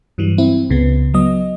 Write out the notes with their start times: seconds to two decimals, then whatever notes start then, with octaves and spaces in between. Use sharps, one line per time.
0.18 G2 E3 F#3 G3
0.38 C4 E4
0.70 C#2 C#3 B3
1.14 F#3 B3 D#5